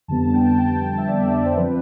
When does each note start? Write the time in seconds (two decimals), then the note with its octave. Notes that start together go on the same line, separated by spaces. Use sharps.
0.08 F2 D3 G3 B3 A5
0.34 G5
0.47 A5
0.58 G5
0.83 A5
0.98 E5
1.07 D5
1.33 D5
1.46 C5
1.57 F3 C4 B4